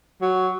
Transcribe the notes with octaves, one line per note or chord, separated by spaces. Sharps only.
F#3